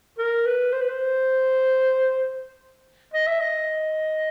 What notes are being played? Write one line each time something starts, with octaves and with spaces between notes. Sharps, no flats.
A#4
B4
C5
B4
C5
D#5
E5
D#5